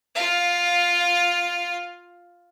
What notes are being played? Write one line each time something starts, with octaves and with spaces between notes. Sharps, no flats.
F4 F5